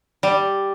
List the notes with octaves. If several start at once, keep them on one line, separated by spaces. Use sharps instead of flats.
G3